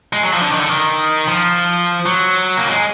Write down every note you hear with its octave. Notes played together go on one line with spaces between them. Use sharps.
G#3
F#3
F3
D3
D#3
D3
D#3
F3
F#3
A#3
G#3